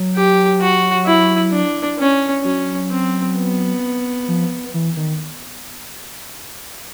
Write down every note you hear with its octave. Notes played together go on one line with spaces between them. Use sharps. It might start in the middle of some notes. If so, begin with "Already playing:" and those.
Already playing: F#3
G4
F#4
E4
D4
C#4
F#3 C#4
C4
B3
F3
E3
D#3